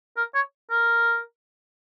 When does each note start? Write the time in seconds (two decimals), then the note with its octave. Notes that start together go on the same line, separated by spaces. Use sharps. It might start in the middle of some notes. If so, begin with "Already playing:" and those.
0.17 A#4
0.34 C#5
0.71 A#4